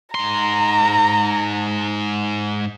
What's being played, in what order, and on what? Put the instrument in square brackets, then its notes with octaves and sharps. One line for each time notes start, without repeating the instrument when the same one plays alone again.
[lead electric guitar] G#2 C6 [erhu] A#5